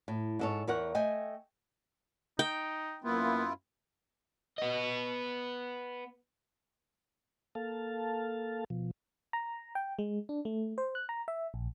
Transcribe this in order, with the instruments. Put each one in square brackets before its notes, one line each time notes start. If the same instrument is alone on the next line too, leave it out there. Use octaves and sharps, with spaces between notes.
[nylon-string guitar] A2
G#2 A4 C#5
E2 A#4 C#5 F#5
A3 D#5 G5 G#5
[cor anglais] D#4 [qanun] G5
[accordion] F#2 E4 F4 [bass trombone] A#3 [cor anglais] B3
[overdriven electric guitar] B3 D#5
[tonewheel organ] A#3 A4 F5 A5
B2 F3
[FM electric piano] A#5
G5
G#3
D4
A3
C5
F#6
A#5
E5
A#1